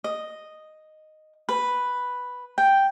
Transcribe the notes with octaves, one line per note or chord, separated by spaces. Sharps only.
D#5
B4
G5